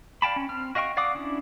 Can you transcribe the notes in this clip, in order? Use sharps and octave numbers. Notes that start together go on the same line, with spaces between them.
D5 F5 G5 A5 B5
C#4
C4 F6
F#4 D#5 F5 G5 C#6
D5 F5 F#5 D6 D#6
C#4 D4 E4